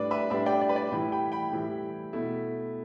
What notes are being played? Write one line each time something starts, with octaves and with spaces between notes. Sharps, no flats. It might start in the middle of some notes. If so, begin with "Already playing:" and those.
Already playing: A2 G3 D4 B4 D5
B4 E5
A2 G3 D4 B4 E5
D5 G5
D5
B4
D5
A2 E3 G3 E4 G5 B5
G5 B5
G5 B5
A2 E3 G3 E4
B2 A3 E4